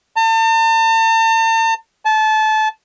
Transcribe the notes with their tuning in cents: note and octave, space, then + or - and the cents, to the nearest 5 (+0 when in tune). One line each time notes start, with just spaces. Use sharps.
A5 +40
A5 -25